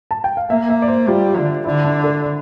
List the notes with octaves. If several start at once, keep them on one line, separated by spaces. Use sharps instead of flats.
A5
G5
F5
A#3 E5
E5
D5
C5
G3 F4
D3
D3 E4
D4
A4